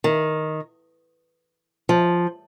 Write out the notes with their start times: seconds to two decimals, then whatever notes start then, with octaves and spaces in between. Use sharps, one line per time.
0.04 D#3
1.89 F3